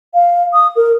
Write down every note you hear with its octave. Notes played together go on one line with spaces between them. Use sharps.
F5
D#6
A#4